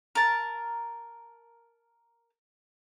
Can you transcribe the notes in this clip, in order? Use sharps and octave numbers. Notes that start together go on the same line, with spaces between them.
A#4 A5